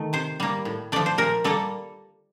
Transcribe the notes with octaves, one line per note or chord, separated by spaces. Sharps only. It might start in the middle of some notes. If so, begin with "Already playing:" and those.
Already playing: D#3 A3
C3 C5
G3 A#3
A2
F3 A3 D5
C5
A#2 A#4
G3 A#3 A4